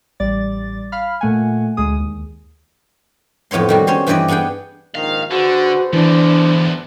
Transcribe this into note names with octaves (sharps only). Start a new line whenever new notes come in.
A1 G3 D5 A6
F5 B5 F6
A#2 A3 F#5 G#5
D2 G#3 G#4 D#6
D#2
F2 A2 B3 C#5 C6
D#3 G3 F#4
C#4 C5 C#5 C6
G2 E3 G4 B4 D5 D#5
B3 D4 G#4 F#5 G5
A#1 G#2 D#3 F5
D3 F#4 G#4 B4 C5
E2 D3 E3 D4